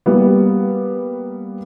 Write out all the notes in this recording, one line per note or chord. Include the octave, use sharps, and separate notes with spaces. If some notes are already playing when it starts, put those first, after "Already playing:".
G3 A#3 B3